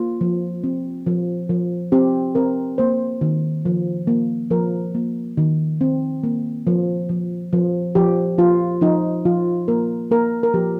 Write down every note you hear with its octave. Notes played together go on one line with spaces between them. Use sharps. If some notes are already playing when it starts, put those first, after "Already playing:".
Already playing: A#3 F4
F3
C4
F3
F3
C4 G4
C4 A#4
A#3 C5
D#3
F3
A#3
F3 A#4
A#3
D#3
C4
A#3
F3
F3
F3
F3 G4
F3 F4
F3 D#4
F3 F4
A#3 A#4
A#3 A#4
A#4
F3 G4